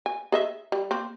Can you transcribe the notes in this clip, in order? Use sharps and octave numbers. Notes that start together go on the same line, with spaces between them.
G#5
G#4 D#5 E5
G3
A#3 C4